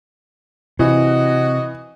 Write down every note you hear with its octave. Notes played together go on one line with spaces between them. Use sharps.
C3 E3 F#4 D#5